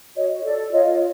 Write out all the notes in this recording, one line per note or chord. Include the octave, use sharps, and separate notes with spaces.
F#4 C#5 D#5
A4 D5
F4 C#5 D#5